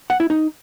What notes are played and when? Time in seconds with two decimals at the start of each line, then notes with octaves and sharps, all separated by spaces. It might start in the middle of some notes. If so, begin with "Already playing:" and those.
0.10 F#5
0.20 E4
0.30 D#4